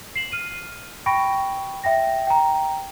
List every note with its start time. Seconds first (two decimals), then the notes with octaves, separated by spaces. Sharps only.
0.15 C7 E7 F#7
0.32 F6 D#7
1.06 G5 B5 C#6 A#6 D7
1.84 E5 G5 A#6
2.27 G5 A#5